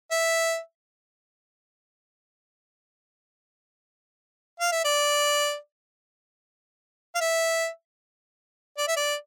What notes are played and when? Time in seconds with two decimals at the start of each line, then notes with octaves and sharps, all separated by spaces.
0.11 E5
4.60 F5
4.72 E5
4.84 D5
7.15 F5
7.20 E5
8.78 D5
8.87 E5
8.96 D5